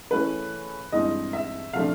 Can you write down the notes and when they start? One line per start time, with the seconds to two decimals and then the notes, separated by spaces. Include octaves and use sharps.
0.10 C#3 E3 A3 C#4 B4
0.92 G2 E3 G#3 C4 D#4 D#5
1.33 E5
1.73 C3 F3 A3 D4 F5